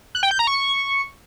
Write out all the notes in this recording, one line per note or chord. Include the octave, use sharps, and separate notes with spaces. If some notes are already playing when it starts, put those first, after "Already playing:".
F#6
G5
G6
A#5
C#6